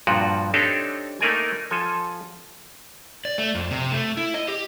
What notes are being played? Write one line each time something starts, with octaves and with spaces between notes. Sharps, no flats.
G2 A#2 F3 F#4
C4 D4 D#4 G4 A4 C#5
A3 A#3 D#4 A#4 D5 G#5
F3 A4 G#5
D5
A3
F2
C3
A3
E4
D#5
G4